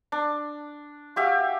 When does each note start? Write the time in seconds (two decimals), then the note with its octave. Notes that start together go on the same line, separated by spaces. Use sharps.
0.12 D4
1.16 F#4 G4 E5 F5